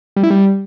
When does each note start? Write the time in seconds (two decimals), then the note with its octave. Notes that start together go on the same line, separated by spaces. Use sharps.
0.16 G3
0.23 E4
0.30 G3